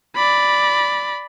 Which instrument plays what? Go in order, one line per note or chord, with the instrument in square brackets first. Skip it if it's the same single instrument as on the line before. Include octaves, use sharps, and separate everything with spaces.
[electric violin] D5 B5